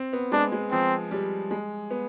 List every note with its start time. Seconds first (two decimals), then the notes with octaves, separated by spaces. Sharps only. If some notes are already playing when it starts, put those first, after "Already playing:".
Already playing: C4
0.13 B3
0.32 G#3 D4
0.52 G#3
0.71 F3 C4
1.11 G3
1.51 G#3
1.90 B3